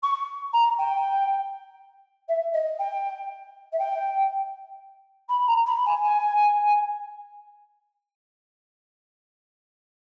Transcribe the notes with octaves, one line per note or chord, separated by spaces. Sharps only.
C#6
A#5
G5
E5
D#5
G5
E5
G5
B5
A#5
B5
G#5
G#5